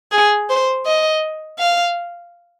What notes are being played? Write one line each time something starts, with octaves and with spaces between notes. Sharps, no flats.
G#4
C5
D#5
F5